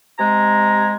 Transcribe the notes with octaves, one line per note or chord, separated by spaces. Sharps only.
C3 G#3 G#5 A#5